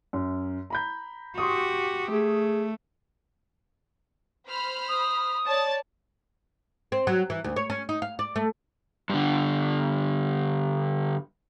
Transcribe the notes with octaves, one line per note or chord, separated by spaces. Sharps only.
F#2
A#5 B5 G6
F#4 G4 C6 C#6 D#6
A3 G#4
C5 B5 F6
D#6
C#5 D5 A5 A6
C4
F#3
E3
D2
C#5
C#4
D#4
F5
D5
A3
G2 D3